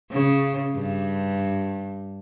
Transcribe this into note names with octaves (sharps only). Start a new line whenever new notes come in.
C#3
G2